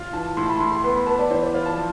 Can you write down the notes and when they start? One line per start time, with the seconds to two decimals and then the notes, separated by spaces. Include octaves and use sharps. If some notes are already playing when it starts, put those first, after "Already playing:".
Already playing: F4
0.13 E3 A5
0.37 A2 C6
0.43 A5
0.49 B5
0.60 A2 C6
0.72 C6
0.84 B3 C6
0.95 B5
1.07 B3 A5
1.18 D5
1.30 E3 C5
1.42 C5
1.54 F4 C5
1.66 A5
1.77 F3